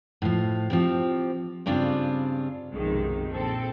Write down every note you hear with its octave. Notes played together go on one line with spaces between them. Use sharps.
A2 F3
F3 C4 G4
G2 C#3 G3 C4 D4 F4
B1 F#2 C3 D#3 F3 G#3
A#1 C4 A4